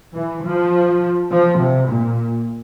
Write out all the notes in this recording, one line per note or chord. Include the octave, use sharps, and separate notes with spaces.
E3
F3
F3
C3
A#2